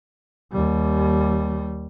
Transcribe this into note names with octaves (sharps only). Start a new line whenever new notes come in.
D#2 G3